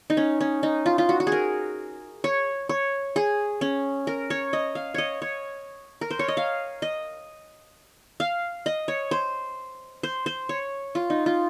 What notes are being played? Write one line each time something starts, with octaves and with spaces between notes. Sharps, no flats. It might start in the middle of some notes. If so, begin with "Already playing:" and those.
D#4
C#4
C#4
D#4
F4
F4
F#4
F#4
G#4
A#4
C#5
C#5
G#4
C#4
A#4
C#5
D#5
F5
C#5 D#5
C#5
A#4
C5
C#5
D#5
F5
D#5
F5
D#5
C#5
C5
C5
C5
C#5
F4
D#4
F4